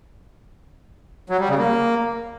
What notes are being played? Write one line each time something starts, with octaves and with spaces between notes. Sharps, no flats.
F#3
G3
C#3
A#3